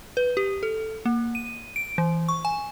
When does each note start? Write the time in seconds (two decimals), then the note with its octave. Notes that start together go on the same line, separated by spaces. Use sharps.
0.17 B4
0.37 G4
0.63 A4
1.05 A#3
1.35 D#7
1.76 D7
1.98 E3
2.29 C#6
2.45 G#5